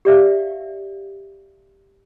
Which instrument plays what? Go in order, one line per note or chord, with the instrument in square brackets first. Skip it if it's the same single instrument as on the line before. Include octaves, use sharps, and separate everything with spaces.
[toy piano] G4 D5 E5 F5